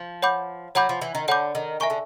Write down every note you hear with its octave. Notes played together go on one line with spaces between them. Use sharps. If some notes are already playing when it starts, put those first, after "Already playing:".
Already playing: F3
C#5 F#5 B5 D6 G6
F#3 C#5 F#5 B5 D6 G6
F3
E3
D#3
D3 C#5 F#5 B5 D6 G6
D#3
D#3 E5 G#5 C#6
D3